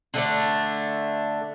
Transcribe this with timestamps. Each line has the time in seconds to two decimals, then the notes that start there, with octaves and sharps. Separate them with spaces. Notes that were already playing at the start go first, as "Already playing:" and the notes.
0.14 D3 A3 D4